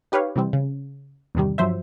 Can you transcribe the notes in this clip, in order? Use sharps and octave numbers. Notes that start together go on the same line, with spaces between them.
D#4 G4 B4 C#5 F5
C3 E3 G3 C4
C#3
E2 G2 C3 D#3 G3
G2 F3 F#3 C5 E5